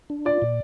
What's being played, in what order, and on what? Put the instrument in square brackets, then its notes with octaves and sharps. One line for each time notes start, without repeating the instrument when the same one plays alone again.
[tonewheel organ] D4
[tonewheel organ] F4 [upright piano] D5
[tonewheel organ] A#2